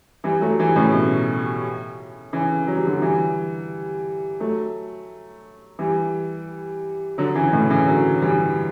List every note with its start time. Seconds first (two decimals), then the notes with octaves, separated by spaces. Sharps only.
0.24 E3 G3
0.41 F#3 A3
0.60 E3 G3
0.76 A2 C#3
0.93 B2
2.33 C#3 E3
2.67 F#3
2.77 G3
2.87 D3 F#3
3.02 E3 G3
4.40 F#3 A3
5.79 E3 G3
7.18 D3 F#3
7.35 C#3 E3
7.53 A2 C#3
7.69 C#3 E3
7.87 D3 F#3
8.22 E3 G3